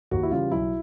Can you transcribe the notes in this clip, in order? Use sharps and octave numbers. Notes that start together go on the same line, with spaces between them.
D#2 F#4
E4
C#3 E3 G3 F4
B1 E4